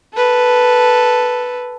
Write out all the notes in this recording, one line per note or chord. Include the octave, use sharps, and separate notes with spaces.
A4 B4